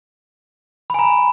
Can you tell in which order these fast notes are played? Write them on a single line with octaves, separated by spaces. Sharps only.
B5 G#5 A#5